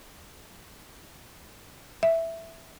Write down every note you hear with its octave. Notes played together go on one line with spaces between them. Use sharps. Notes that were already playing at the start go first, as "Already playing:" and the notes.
E5